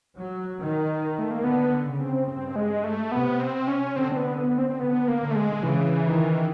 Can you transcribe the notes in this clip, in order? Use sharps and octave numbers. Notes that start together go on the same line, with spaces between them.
F#3
D#3
A3
A#3
D3 B3
C#3
C4
G2 C4
G#3
A3
C3 B3
C4
C#4
D3 C4
C4
B3
B3
C4
C4
D3 B3
A#3
D3
A3
G#3
C#3 E3
D#3